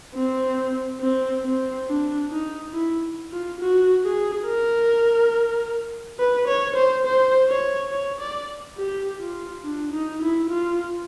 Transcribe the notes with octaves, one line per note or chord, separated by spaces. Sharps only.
C4
C4
C4
D4
D#4
E4
F4
F#4
G#4
A#4
B4
C#5
C5
C5
C#5
C#5
D5
G4
F4
D4
D#4
E4
F4